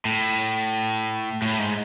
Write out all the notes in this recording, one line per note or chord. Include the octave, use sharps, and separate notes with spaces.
A2
A2
G#2